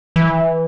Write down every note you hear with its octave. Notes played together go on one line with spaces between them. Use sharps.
E3